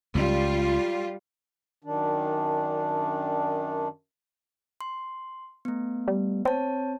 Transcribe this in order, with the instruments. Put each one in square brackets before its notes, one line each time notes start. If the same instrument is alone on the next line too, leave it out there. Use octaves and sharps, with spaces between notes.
[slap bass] C#2 [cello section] G3 F4
[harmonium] F#2 D#3 D4
[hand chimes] C6
A3 B3
[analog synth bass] G3
[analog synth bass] C4 [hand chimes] C#5 A5